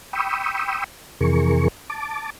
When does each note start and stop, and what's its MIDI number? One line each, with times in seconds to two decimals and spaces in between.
0.13 0.84 79
0.13 0.84 83
0.13 0.84 85
0.13 0.84 87
0.13 0.84 88
1.21 1.68 41
1.21 1.68 48
1.21 1.68 52
1.21 1.68 68
1.21 1.68 70
1.21 1.68 85
1.90 2.30 81
1.90 2.30 86